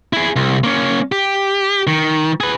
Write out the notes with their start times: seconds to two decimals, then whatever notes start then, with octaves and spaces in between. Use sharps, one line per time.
0.13 E4 G#4
0.36 C2
0.64 A#3 C#4
1.12 G4
1.87 D#3
2.40 G#4 B4